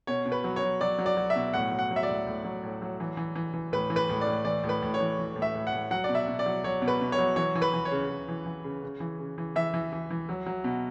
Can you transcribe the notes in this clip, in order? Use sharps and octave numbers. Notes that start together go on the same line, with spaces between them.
B2 C#5
B2
B4
F#3
C#5
F#3
F#3 D5
F#3
D5
F#3
E5
B2
A2 F#5
F#3
F#5
F#3
E5
D5
A2
A2
F#3
A2
F#3
E3
E3
E3
E3
A2 B4
E3
B4
A2
D5
A2
E3 D5
A2
B4
A2
C#5
E3
E3
A2
E5
A2
F#5
A2
F#3 F#5
D5
B2
E5
B2
D5
F#3
F#3 C#5
B2
B4
B2
C#5
F#3
E3 C#5
E3
B4
E3
C#5
C#3
C#3
E3
E3
C#3
C#3
E3
C#3
E3
E3 E5
E3
E3
E3
F#3
F#3
B2